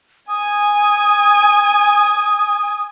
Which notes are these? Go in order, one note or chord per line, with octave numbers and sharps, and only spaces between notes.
G#5 D#6